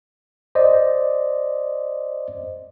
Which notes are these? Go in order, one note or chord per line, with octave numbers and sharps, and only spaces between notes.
C5 D5 D#5